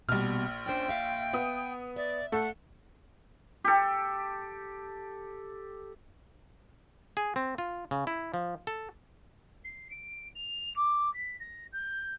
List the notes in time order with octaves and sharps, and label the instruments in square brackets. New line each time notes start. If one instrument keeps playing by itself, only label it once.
[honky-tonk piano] A#1 F6 [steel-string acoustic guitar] B2 G3
[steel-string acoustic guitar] C#4 D4 C5 [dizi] G5
[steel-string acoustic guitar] E5 F5
[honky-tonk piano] B3 D#6
[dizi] D5 [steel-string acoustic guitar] E5
[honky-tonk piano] A3 A4 [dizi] F#5
[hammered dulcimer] G4 A4
[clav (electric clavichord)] G#4
C4
F4
C#3
E4
F3
A4
[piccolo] C7
D7
F7
D6
B6
A#6
G6